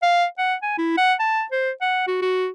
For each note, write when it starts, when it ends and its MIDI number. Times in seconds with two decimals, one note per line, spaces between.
0.02 0.25 77
0.38 0.54 78
0.62 0.74 80
0.78 0.95 64
0.97 1.14 78
1.19 1.43 81
1.52 1.71 72
1.81 2.05 78
2.07 2.20 66
2.22 2.48 66